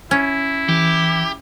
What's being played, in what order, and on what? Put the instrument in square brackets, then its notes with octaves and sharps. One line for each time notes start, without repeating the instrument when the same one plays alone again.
[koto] C#4 [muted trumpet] E4
[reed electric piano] E3 [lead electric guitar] G4